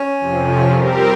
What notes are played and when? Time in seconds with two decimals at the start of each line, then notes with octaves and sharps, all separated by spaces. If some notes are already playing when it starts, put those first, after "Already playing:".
Already playing: C#4
0.20 F2 C3 F3
0.71 G3 C4 G4 A#4